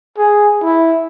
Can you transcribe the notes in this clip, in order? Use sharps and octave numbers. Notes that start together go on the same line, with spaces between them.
G#4
E4